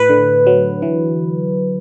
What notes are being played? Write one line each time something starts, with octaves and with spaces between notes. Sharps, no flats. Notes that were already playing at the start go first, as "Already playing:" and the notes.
Already playing: A2 B4
D3
F#3
E3